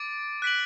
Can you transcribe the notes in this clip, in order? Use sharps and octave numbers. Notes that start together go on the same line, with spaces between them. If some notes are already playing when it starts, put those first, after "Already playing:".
Already playing: D6 A6 D7
F#6 B6 D7 F#7